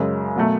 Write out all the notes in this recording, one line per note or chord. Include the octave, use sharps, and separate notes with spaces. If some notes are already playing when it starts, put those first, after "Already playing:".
Already playing: F#2 C#3 G#3 C#4
B2 F#3 A3